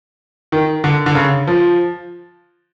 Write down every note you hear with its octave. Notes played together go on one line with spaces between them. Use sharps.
D#3
D3
D3
C#3
F3